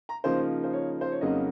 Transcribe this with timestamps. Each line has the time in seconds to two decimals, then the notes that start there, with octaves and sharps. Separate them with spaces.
0.09 A#5
0.24 C#3 F3 A#3 D#4 C5
0.64 C5
0.73 C#5
1.01 C5
1.12 C#5
1.21 F2 C#3 F#3 A#3 D#4 D#5